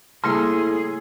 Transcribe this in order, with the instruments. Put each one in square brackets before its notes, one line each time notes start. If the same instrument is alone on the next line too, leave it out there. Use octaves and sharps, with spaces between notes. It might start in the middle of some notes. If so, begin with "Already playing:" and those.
[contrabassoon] A2 [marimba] C#3 G3 A#3 [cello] G#4 [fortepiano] C6 E6